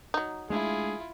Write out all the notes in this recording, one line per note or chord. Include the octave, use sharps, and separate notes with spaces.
F#3 D#4
G#3 A3 D4 E4 F4 G#4